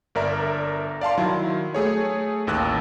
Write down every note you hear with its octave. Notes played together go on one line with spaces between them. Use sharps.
G1 A#4 D5 E5 A#5
D5 F5 A5 C6
D#3 F#3 E4
A3 G#4 C#5
A1 D#2 E6 F#6